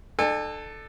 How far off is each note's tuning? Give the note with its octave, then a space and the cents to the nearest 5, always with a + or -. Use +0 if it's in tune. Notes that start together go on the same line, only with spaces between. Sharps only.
D4 +45 A4 +0 G#5 -40